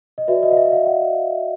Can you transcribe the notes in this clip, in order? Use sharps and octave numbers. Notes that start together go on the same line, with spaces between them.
D#5
F#4 B4 D5 E5
D#5
F5
E5
F5
F#5